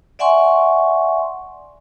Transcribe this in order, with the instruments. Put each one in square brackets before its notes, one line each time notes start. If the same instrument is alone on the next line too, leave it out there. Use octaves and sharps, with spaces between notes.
[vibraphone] D5 E5 F#5 G#5 C6 C#6